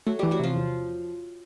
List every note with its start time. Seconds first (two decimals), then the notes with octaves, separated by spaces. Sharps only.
0.07 F#3 A3 F#4
0.19 E3 G3 G4
0.31 F#3 F#4
0.39 C3 F3 F4
0.55 E2